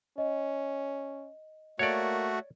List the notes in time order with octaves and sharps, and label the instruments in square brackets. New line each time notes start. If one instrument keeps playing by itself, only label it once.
[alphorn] C#4 [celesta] D#5
[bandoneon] A3 F#4 [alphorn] A#3 [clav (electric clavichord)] C#5 D5